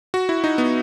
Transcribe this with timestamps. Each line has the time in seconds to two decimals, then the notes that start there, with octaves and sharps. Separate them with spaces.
0.14 F#4
0.29 E4
0.44 D#4
0.58 B3